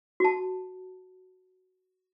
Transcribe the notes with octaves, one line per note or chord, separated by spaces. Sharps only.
F#4 A5